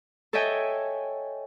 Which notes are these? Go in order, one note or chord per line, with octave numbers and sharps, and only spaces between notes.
A4 C#5 D#5 E5 G5 G#5